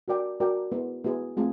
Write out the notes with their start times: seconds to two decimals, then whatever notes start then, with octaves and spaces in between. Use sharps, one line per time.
0.08 F#4 A#4 D5 G5
0.40 F#4 A#4 D5 G5
0.72 B3 E4 G#4
1.04 B3 E4 G#4
1.37 A3 C4 F4 G#4